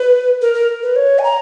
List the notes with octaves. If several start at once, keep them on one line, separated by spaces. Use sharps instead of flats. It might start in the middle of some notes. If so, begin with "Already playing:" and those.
Already playing: B4
A#4
A#4
B4
C#5
G#5
A#5